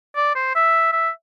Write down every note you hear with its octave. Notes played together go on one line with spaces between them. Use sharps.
D5
C5
E5
E5